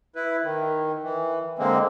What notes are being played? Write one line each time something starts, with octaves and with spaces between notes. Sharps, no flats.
E4 B4
D#3
E3
D3 G#3 A#3 C4